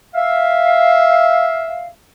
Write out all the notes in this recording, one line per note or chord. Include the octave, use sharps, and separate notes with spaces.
E5 F5